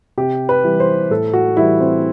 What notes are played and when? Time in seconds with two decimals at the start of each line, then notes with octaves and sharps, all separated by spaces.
0.18 C3 G4
0.49 B4
0.64 E3 G3
0.80 C5
1.10 A2 A4
1.33 F#4
1.57 E3 G3 E4
1.80 C4